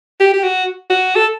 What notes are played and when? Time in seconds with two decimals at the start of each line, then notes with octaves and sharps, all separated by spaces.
0.20 G4
0.33 G4
0.43 F#4
0.90 F#4
1.16 A4